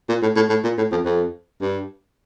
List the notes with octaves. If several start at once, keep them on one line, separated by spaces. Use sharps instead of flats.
A#2
A2
A2
A2
A#2
A2
F2
F2
G2